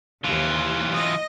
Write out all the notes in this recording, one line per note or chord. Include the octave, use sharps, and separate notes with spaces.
D#2 E3 F4
D#5